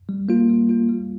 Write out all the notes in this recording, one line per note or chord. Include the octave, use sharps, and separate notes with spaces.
G3
A#3 F4
G3
A#3 F4
G3